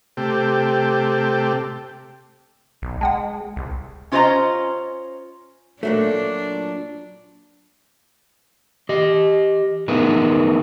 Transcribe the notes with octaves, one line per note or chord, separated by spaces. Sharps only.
C3 A3 G4
B1
G#3 F#5 G5 A5
C2
C#4 F4 B4 C5 D#5 A#5
A#2 F#3 A3 D4
G4 D#5
B3 D#4 G#4 A#4 B4